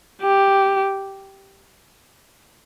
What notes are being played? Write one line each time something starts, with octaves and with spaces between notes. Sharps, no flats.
G4